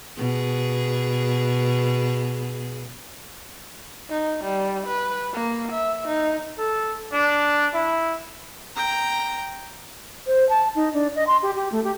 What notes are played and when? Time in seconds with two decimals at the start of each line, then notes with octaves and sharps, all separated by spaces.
0.17 B2 G#4
4.10 D#4
4.44 G3
4.87 B4
5.33 A#3
5.72 E5
6.08 D#4
6.58 A4
7.12 D4
7.74 E4
8.76 G5 A#5
10.27 C5
10.49 A5
10.75 D#4
10.93 D4
11.15 D#5
11.27 C6
11.42 G4
11.56 G4
11.72 A3
11.84 G4